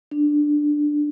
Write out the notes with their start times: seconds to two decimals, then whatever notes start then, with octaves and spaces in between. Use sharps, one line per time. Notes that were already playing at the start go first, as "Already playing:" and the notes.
0.11 D4